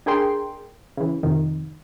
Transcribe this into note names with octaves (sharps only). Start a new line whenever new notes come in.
D4 G#4 A#4 G5 C6
C#3 E3
F2 C3 D#3